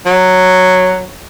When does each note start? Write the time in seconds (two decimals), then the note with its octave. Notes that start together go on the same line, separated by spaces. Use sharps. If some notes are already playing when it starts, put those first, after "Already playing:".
0.06 F#3